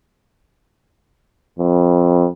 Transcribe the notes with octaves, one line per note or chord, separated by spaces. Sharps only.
F2